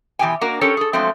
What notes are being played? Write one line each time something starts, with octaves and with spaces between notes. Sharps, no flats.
B2 E3 G3 G4 G5 G#5
A#3 D4 F#4 A#4
C#4 G4 A4 A#4 C#5
G#4 A4
F3 F#3 G#3 A3 C4